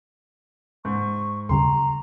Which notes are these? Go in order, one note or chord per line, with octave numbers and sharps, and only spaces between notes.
G#2 C#6
D#2 C#3 G3 A#5 C6